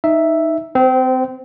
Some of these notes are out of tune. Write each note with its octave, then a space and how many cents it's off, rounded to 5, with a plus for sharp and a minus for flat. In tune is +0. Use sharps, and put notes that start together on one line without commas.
D#4 +0 E5 +0
C4 -25 C5 +0